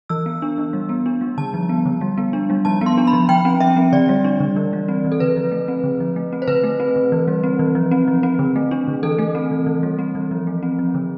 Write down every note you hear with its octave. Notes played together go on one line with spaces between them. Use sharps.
E3 E6
B3
D4
E3
G3
B3
D4
G3
D3 A5
F3
B3
D3
G3
B3
D4
G3
F3 A5
B3
C6
D4
B5
F3
F3 G5
C4
F3 E5
C4
D3 D5
G3
D4
D3
E3
G3
C4
E3
A4
D3 B4
F3
A3
C4
D3
F3
A3
C4
C5
D3 B4
A3
C4
D3
E3
G3
C4
E3
F3
C4
F3
C4
D3
A3
D4
D3
E3 A4
A3
C4
E3
E3
G3
C4
E3
F3
A3
C4
F3
D3